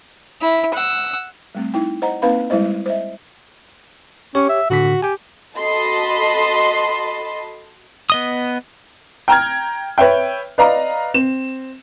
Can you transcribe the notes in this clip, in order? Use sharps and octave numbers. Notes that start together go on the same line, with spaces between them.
E4
F#5 E6
G3 A3 C4
D#4 E4 G5
C5 D#5 F#5 A#5
A#3 C4 D#4 B4 F5 B5
G3 G#3 E4 C5 D#5
C5 D#5 E5
C#4 G4 C#5
E5
A2 D3 F#4 B6
G4 G5 G#5
F#4 A4 D#5 A5 B5 C6
B3 D#5 D#6
G5 A#5 F6 G#6
B4 C#5 E5 G5
B4 D5 D#5 F5 A#5
C4 E7